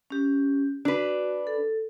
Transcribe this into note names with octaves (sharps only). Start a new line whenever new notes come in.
C#4 G4
D4 F#4 B4
A4